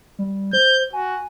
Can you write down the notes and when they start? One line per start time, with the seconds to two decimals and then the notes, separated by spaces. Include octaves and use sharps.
0.19 G3
0.53 C5 G6
0.93 F#4 G#5